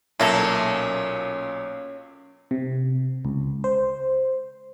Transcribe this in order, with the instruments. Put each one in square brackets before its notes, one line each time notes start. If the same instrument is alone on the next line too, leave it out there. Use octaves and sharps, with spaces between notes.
[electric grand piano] B1 A#2 [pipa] A3 A#3 A4 [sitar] C#4
[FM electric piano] C3
C#2
C5